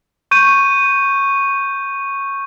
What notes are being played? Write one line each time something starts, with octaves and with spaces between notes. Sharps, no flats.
C#6 G6 D#7